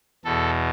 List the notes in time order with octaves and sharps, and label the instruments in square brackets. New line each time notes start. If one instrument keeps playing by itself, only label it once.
[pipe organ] E2 B2 A4